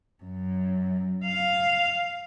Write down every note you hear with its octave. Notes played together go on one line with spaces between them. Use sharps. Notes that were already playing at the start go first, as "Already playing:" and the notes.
F#2
F5